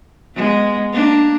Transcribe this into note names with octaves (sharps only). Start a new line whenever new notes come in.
G#3 B3
A#3 D4